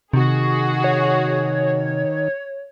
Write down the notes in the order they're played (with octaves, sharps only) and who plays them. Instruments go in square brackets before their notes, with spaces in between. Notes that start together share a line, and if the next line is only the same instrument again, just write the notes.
[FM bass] C3 [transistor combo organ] D#3 [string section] F#4 G#4
[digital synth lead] C#5